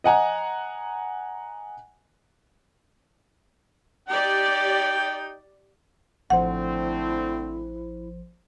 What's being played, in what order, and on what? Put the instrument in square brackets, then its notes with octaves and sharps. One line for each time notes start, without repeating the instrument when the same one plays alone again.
[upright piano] D#5 F#5 G#5 A#5
[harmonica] D#4 G5 [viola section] G4 D5
[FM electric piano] A1 F3 C5 [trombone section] D3 A3 C4 [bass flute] E4 [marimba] F#5